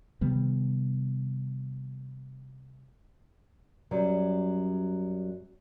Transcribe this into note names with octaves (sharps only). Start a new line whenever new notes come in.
C3 D#3 G3 B3
F#2 F#3 G3